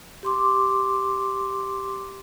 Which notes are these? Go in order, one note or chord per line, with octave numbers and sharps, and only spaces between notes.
G4 C6 D6